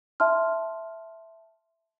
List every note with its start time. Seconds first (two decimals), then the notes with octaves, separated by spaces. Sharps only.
0.20 E5 A5 C6 F6